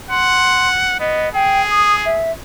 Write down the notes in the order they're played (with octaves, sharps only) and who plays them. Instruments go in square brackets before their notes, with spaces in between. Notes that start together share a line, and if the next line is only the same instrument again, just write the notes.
[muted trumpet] F#5 [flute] C6
[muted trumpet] B3 [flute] D#5
[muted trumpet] G#4 [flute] G5
[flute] D#6
E5